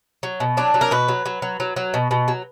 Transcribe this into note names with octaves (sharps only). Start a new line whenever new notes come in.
F#3
B2
F#3 D4
F#3
A#4
B2 B4
F#3
F#3
F#3
F#3
F#3
B2
B2
F#3